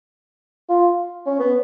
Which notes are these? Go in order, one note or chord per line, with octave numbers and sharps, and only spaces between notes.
F4
C#4
B3